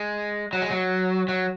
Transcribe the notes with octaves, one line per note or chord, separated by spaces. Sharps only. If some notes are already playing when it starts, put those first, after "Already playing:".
Already playing: G#3
F#3
G#3
F#3
F#3